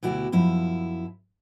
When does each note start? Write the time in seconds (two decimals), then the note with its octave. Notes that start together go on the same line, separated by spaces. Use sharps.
0.03 D2 B2 E4 F#4 G4
0.32 F#2 F3 E4